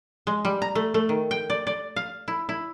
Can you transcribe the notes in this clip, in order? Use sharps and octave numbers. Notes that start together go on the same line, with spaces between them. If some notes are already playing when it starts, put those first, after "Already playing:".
G#3
G3
A#5
A3
A3
D#3
G5
D5
D5
F5
E4
E4